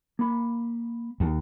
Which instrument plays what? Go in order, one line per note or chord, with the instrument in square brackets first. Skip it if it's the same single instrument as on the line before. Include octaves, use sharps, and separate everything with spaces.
[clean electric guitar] A#3 B5
[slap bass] D#2